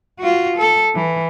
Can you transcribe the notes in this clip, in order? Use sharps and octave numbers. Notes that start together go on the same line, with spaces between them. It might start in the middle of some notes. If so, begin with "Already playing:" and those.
F4 F#4
A4
E3